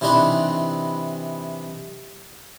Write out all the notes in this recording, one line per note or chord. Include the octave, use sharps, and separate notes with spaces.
C3 E3 C4 D4 D#4 B4